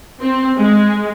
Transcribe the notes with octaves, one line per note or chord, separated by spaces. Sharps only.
C4
G#3